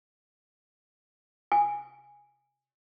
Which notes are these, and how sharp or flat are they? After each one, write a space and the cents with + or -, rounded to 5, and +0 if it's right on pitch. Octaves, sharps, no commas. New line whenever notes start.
G#5 -10